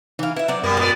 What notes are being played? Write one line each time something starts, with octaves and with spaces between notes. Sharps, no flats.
E3 D#4 F5
E4 B4 E5
F#3 C4 D5
F#2 B2 G3 B3 A#4
A#2 G#3 B3 D5